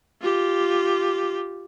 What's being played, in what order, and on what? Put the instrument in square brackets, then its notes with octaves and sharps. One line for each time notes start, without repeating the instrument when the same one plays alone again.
[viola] F4 G4